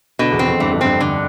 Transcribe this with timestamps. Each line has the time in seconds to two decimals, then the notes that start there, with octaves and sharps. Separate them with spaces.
0.19 B2 D3
0.32 E2
0.39 C4
0.47 F2
0.60 G2 E3
0.71 F2
0.81 G2 C4
1.01 D3